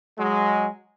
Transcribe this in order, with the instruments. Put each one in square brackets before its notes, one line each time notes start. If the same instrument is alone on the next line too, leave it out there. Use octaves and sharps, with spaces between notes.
[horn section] F#3 G#3